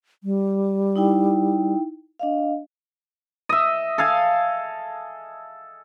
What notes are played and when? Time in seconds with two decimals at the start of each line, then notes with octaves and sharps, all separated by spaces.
0.24 G3
0.96 D#4 E4 G5
2.19 D4 D#5 F5
3.49 D#5 E5
3.98 A4 F5 G#5